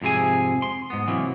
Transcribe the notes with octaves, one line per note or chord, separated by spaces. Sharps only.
F2 G#2 C3 G#4 G#5
C6
G#2 B3
C3 E3 F#3 A#3